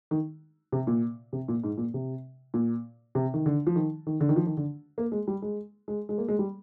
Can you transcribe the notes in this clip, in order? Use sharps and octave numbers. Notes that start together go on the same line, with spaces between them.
D#3
C3
A#2
C3
A#2
G#2
A#2
C3
A#2
C3
D#3
D3
F3
D#3
D#3
D3
D#3
F3
D#3
D3
A#3
G#3
G3
G#3
G#3
G#3
A#3
G#3
G3